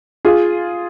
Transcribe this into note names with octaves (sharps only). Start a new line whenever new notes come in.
F4 G#4